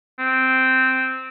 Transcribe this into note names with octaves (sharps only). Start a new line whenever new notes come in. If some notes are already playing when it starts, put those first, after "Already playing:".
C4